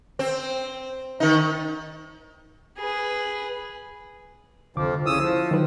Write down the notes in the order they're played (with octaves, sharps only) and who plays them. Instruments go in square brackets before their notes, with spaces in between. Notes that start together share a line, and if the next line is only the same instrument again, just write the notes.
[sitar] C4
D#3 D#4
[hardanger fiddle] G#4 B4
[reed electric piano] C2 D3 D6 [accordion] F2 F3
[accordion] C#3 D#6 E6 [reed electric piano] E4
[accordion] F3
[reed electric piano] D#3 F#3 B4